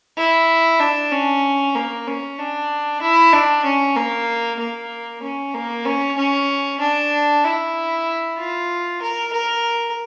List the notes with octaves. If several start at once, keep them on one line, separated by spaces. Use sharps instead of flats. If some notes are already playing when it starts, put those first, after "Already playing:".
E4
D4
C#4
A#3
C#4
D4
E4
D4
C#4
A#3
A#3
C#4
A#3
C#4
C#4
D4
E4
F4
A#4
A#4